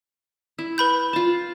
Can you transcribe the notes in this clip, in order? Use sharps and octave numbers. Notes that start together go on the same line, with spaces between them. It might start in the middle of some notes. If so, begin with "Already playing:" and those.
E4
B4 B5 G6
F4 A5